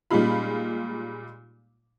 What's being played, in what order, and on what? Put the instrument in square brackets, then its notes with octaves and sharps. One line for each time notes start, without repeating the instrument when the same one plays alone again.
[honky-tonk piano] A#2 G3 G#3 D#4 F4 B5